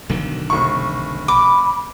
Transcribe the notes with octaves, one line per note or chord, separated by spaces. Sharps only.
B1 D3 D#3
F1 C#6
B5 D6